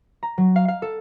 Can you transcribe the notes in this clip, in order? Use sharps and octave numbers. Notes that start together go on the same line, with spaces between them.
A#5
F#3
F5
F5
A4